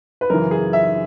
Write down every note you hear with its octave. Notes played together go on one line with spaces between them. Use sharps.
B4
F#2 C#3 E3 A#4
G#4
E5